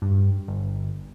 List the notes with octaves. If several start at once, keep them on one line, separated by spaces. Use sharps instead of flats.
G2
G1